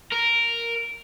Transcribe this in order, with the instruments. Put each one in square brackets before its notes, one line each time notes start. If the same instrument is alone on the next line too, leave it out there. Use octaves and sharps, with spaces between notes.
[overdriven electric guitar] A#4